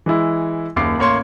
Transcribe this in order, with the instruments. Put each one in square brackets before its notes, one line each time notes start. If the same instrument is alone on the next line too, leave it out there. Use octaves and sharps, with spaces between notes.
[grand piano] E3 G#3 E4
F#1 D#2 D6 C7
A1 A#3 C#5 C6